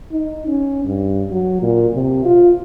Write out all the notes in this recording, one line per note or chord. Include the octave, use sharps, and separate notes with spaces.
D#4
C#4
G2
F#3
A#2
C3
F4